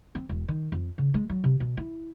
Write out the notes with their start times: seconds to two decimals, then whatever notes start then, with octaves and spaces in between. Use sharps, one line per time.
0.15 C4
0.29 E1
0.48 D#3
0.72 F2
0.98 C#3
1.14 G#3
1.30 F#3
1.44 C3
1.60 B2
1.77 E4